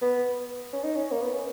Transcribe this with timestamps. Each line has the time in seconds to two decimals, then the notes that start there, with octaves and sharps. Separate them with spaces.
0.02 B3
0.73 C#4
0.84 D#4
0.96 C#4
1.11 A#3
1.21 B3
1.33 C#4